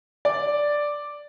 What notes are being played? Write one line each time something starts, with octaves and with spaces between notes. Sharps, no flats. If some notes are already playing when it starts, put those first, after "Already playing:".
D5